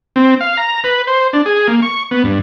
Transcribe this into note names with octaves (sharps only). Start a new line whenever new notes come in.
C4
F5
A#5
B4
C5
D4
G#4
A#3
C#6
B3
G2